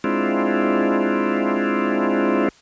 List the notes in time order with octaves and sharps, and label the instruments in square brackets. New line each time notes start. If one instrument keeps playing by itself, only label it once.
[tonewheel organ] G#3 C4 D4 E4 F4